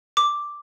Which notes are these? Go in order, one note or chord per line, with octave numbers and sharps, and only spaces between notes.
D6